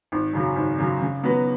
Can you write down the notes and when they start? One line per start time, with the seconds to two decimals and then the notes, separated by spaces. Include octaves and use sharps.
0.12 G#1
0.33 F#2 C#3 F#3
0.56 G#1
0.78 F#2 C#3 F#3
1.00 C#3
1.23 F#3 B3 F#4 B4